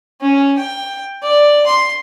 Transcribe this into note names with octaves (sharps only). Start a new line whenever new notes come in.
C#4
G5
D5
C6